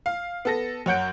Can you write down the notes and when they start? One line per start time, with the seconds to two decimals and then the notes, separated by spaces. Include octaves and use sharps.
0.06 F5
0.45 B3 A4 A#6
0.86 F#2 C#5 F#5 G6 D7